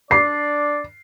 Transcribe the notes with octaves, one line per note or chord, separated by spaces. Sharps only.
D4 D5 C7